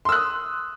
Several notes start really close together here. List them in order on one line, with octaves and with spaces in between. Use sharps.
C6 E6 F#6 D#6